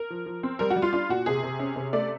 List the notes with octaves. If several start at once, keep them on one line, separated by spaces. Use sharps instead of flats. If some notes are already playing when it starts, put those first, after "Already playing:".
Already playing: A#4
F3
F3
C4
G3 A#4
F#4
G3
F4
D4 F4
A#2 F#4
C3 G#4
C3
C#4
C3
A3 D5